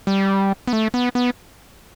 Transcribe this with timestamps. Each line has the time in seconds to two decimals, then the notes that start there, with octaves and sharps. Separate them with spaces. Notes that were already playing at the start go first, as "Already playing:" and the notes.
0.07 G3
0.67 B3
0.73 A3
0.94 B3
1.15 B3